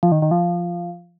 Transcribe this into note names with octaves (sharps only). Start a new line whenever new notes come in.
F3
D#3
D#3
F3